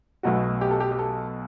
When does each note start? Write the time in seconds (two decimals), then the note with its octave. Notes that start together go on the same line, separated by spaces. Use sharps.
0.23 B1 B2 A3 F#4
0.61 G4
0.71 A4
0.80 G4
0.92 G4
0.99 A4